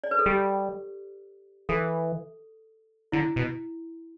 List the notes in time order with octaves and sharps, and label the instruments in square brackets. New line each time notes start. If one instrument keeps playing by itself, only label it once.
[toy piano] D5
B4
A4
[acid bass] G3 [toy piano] G4
[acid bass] E3 [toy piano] A4
[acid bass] D3 [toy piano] E4
[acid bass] B2